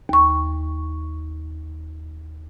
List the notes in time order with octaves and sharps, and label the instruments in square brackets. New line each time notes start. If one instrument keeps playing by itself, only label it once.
[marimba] D#2 C#6